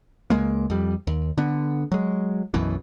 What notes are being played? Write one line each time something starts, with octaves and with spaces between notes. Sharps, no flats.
C#2 F#2 G#3 A#3
F2 G3
D#2
D3 B3
F#3 G#3
B1 F#2 B2 E3